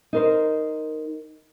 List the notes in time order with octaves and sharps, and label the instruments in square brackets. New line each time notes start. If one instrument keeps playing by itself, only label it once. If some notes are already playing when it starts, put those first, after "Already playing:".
[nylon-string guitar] D#4 A#4 C5